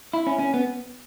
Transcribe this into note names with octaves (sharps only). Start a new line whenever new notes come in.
E4
C#4
C#4
B3